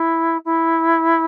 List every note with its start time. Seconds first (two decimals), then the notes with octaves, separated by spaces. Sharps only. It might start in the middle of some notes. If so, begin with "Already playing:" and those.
Already playing: E4
0.45 E4